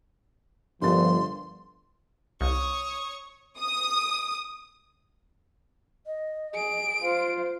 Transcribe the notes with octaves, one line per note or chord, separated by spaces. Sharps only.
G1 G2 F3 A#4 C6 A6
C2 C#5 C#6 D#6
D#6
D#5
G#4 D7
F4 C5 F5